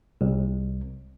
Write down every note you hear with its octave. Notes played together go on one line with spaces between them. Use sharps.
C2